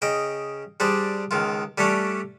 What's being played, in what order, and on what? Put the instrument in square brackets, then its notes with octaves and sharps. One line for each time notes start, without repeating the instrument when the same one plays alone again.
[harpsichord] C#3 D#5 G5
G3 D4 G#4 C5
C#2 D#3 F4
G3 A3 C#4 D4 C#5